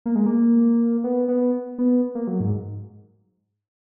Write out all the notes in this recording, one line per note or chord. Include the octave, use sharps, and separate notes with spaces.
A#3
G#3
A#3
B3
B3
B3
A#3
F#3
G#2